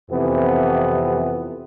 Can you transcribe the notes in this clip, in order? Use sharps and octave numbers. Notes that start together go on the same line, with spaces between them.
F2 C3 E3 B3